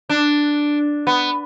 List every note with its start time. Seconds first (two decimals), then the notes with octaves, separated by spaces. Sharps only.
0.09 D4
1.07 B3